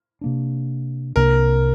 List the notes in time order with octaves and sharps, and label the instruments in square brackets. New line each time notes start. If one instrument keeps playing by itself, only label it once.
[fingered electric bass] C3 A#3 D4
[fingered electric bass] C2 C3 A#3 D4 [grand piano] A#4